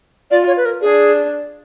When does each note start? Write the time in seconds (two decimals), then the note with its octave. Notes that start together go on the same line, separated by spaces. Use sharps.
0.31 F4 D5
0.47 C#5
0.57 B4
0.65 A#4
0.82 D4 G#4